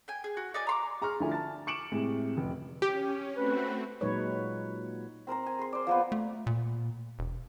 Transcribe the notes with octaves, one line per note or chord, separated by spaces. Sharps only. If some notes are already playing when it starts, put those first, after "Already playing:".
G5 G#5
G#4
F#4
D#4 D5 G#5
A#5 C6 D6
G#4 A#5 C6 C#6 F6
D2 F3 D4 E4 A4 G#5
A5 A6
C#6 D6 C#7 D7 E7 F#7
A2 C3 G#3
F1
C#4 G4
A3 C4 F#4 B4
A#2 F#3 G#3 D#4 B4 C#5
C4 A#4 C5 A#5
G#5
G#4 C6
C5 D5
F3 A#3 B3
A3
A#2
E1